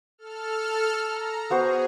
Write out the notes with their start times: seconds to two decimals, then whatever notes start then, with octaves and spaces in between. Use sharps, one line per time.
0.18 A4 F6
1.09 A#5
1.50 B3 F#4 G#4 C5